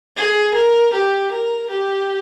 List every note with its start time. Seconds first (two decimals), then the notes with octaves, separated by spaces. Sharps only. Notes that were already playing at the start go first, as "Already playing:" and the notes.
0.17 G#4
0.54 A#4
0.93 G4
1.31 A#4
1.70 G4